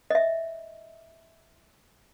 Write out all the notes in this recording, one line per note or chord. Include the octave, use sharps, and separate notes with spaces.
D#5 E5